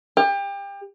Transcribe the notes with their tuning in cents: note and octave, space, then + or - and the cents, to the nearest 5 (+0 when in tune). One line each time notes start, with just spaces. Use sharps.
G4 +30